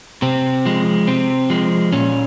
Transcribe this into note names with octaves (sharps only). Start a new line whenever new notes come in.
C3 C4
F3 G#3
C3 C4
F3 G#3
A#2 C#4